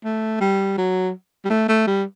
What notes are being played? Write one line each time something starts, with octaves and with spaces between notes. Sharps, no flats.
A3
G3
F#3
G3
A3
A3
G3